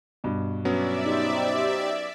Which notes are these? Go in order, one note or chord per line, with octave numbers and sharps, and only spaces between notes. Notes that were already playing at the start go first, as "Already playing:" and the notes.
G2 B2
F#3 B3 C#4 D5 E5
D#4 G4 C5